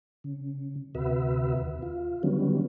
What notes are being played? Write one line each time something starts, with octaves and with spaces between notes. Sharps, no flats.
C#3
D2 C3 F#4 B4 E5
D#2
F4
D3 D#3 F#3 G3 B3 C#4